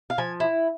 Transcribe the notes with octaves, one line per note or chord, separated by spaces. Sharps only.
F5
F3 G#5
E4